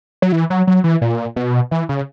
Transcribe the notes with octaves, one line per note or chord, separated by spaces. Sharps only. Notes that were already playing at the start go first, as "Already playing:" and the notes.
F#3
E3
F#3
F#3
E3
A#2
B2
E3
C#3